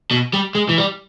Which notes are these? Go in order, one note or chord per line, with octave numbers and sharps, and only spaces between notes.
B2
G3
G#3
E3
G3